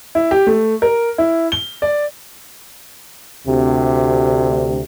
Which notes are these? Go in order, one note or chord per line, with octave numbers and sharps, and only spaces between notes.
E4
G4
A3
A#4
E4
G7
D5
D2 C3